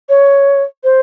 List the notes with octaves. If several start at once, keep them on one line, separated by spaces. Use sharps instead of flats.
C#5
C5